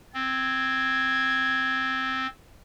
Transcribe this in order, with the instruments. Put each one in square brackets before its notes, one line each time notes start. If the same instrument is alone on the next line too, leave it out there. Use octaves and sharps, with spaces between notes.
[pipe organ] C4 [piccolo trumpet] G#6